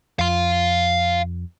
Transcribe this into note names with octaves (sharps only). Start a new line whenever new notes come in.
F2 F5 C6